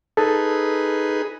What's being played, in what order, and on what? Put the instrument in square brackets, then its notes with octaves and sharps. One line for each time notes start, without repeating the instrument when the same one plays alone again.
[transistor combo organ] D#4 G#4 B4 [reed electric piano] A4